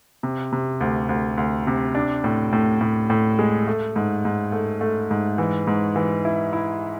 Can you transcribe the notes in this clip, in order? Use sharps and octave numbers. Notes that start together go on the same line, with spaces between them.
C3
C3
D2
D2
D2
C3
D4
A2
A2
A2
A2
G#3
A3
G#2
G#2
A3
A3
G#2
E3
G#2
E3
E4
E4